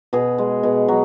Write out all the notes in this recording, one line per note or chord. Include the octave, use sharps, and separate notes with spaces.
B2 G#4
G#3
B2
F#3